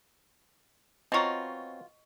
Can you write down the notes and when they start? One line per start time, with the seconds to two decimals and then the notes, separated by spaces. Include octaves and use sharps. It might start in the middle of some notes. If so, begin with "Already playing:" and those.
1.12 B2 C4 F4 C#5 D#5 A#5 C#6